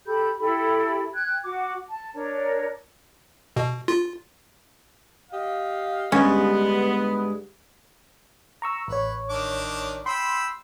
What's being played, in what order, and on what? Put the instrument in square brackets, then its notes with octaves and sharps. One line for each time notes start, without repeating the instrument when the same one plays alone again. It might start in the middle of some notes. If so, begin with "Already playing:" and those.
[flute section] G4 A4 B5 G6
E4 G4 A4 B5
G5 F#6 G#6
F#4 F#5 D6
A5
D4 A#4 C#5
[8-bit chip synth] B2
F4
[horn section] G4 D#5 F5
[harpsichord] D2 G2 [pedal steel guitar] G#3 [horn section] B3 [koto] C#4
[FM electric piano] A#5 C#6 E6
[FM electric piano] A1 C#5 [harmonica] B4
[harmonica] D#3 D4 D6
[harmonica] G5 B5 E6 [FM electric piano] C6